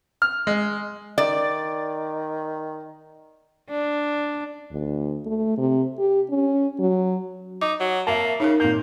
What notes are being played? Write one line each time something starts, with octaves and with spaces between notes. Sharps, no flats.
F6
G#3
D#3 D5
D4
D2
A3
C3
G4
C#4
F#3
D#4 D6
F#3
A#3 E5 A5
C#3 D#4 A#4
A#2 A#3 G6